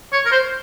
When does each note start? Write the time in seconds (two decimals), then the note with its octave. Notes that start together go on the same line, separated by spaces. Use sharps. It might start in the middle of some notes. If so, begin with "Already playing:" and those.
0.12 C#5
0.26 A#4
0.32 C5